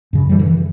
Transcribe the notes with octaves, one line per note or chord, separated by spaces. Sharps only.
F#2 C#3
E3 G3
D3
E3